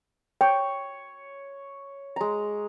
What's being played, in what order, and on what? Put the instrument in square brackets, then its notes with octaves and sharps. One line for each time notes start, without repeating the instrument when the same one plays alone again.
[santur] C#5 [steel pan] G5
[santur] G#3 A#5